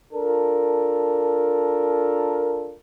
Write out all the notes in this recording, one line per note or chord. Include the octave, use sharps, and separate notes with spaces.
D4 F4 A4 A#4